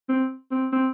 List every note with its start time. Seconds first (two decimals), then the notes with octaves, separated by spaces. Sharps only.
0.09 C4
0.51 C4
0.72 C4